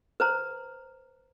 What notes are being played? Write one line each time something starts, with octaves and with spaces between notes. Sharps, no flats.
B4 C5 A#5